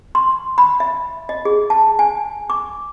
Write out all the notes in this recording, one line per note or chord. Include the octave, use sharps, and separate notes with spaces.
C6
B5
E5
D#5
G#4
A5
G#5
D6